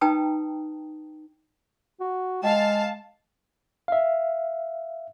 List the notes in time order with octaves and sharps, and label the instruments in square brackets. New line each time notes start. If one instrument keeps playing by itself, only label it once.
[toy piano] D#4 B4 G5 A5 A#5 D#6
[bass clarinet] F#4
[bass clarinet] G#3 [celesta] D#5 G5 [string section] F5 A5
[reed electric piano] E5 F5